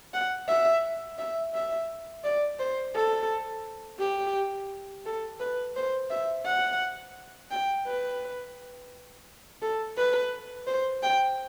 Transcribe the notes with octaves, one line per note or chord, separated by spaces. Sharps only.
F#5
E5
E5
E5
D5
C5
A4
G4
A4
B4
C5
E5
F#5
G5
B4
A4
B4
C5
G5